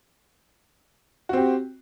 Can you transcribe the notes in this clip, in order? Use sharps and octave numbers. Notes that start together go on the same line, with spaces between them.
C4 F#4 G4